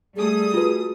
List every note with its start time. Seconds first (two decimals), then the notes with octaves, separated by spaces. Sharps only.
0.17 G3 A3 G#4 D#6
0.54 F4 F#4 B4